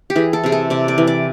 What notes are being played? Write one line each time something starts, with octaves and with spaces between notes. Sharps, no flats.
G4
E3 G#4
A4
C3 G#4
A4
C3 D5
D5
E3
D5